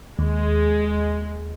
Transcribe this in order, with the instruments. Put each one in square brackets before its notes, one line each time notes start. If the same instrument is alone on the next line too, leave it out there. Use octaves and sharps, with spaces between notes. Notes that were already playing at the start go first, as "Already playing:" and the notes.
[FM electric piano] D#2 [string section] G#3